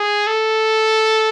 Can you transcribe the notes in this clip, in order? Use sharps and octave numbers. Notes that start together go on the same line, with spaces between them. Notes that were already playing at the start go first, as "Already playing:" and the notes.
Already playing: G#4
A4